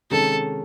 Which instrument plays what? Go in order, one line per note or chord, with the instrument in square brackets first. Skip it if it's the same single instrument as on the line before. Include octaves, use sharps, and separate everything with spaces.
[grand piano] C3 D#3 G#3 C#4 [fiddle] A4